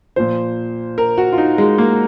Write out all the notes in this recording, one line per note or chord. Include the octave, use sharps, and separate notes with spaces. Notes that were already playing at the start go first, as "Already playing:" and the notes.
A#2 F3 C5
A#4
F#4
F4
D#4
G#3
A#3